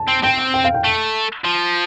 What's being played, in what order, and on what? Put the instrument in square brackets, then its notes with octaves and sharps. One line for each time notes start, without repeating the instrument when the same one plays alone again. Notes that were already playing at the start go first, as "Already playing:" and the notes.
Already playing: [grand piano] A5
[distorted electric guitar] C4
[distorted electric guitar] C4 [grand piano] G5
[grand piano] G5
F5
G5
[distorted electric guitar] A3
F3